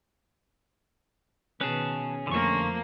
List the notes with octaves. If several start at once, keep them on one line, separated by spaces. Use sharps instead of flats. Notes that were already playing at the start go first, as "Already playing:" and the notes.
B2 D#3 C#4 G#4 B4 A5
F2 D3 F3 A3 A#3 F4 C#6